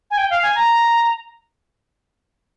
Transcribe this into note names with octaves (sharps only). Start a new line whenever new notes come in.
G#5
G5
F5
G#5
A#5